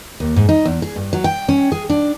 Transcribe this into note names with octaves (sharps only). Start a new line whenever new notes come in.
D#2
G#2
D#4
E2
G#4
G2
F#3
G5
C#4
G#4
D4